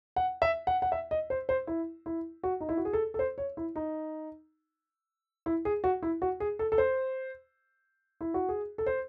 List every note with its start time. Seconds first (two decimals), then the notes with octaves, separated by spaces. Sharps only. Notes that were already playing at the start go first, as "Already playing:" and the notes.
0.16 F#5
0.42 E5
0.67 F#5
0.82 F#5
0.92 E5
1.11 D#5
1.30 C5
1.49 C5
1.67 E4
2.06 E4
2.43 F#4
2.61 D#4
2.69 E4
2.77 F#4
2.85 G#4
2.93 A4
3.14 A4
3.19 C5
3.38 C#5
3.57 E4
3.76 D#4
5.46 E4
5.65 G#4
5.84 F#4
6.03 E4
6.22 F#4
6.40 G#4
6.59 A4
6.72 A4
6.78 C5
8.21 E4
8.34 F#4
8.49 G#4
8.78 A4
8.86 C5